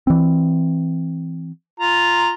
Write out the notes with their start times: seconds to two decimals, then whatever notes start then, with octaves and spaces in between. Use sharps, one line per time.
0.07 E3 C4
1.80 F4 A#5